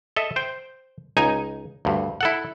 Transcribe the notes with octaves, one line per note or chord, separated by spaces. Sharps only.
A4 D#5 E5
C5 G5
C#2 D#4 G#5
D2 G2
E4 A4 F#5